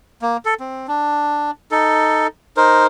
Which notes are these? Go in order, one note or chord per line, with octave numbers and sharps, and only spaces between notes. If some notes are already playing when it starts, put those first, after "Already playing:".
A#3
A4
C4
D4
D#4 A4
D#4 A#4 C5